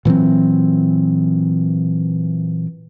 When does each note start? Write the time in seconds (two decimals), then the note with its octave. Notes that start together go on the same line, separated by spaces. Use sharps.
0.05 A#2 E3 F#3 C4